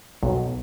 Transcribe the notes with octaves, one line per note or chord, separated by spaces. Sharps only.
B1